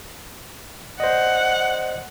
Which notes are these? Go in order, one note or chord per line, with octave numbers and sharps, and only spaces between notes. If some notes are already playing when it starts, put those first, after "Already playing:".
C5 D5 D#5 F#5